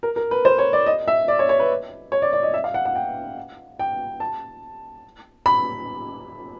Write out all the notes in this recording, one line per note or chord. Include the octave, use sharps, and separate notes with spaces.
A#4
A#4
B4
C5
C#5
D5
D#5
E5
D5
C#5
C#5
B4
C#5
D5
D5
D#5
E5
F5
F#5
F#5
G5
G5
A5
B5